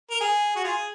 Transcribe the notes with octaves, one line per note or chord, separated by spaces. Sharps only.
A#4
G#4
F#4
F4 G#4